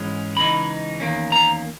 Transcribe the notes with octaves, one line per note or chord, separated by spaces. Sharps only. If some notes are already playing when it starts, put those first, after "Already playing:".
Already playing: G#2 E3 G#3 C#4
C#3 E3 G#3 D#4 B5
E2 D#3 A#3 C#4
A#5